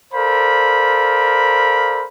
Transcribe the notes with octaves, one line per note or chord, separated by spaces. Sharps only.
A4 A#4 C5 D5 F5 B5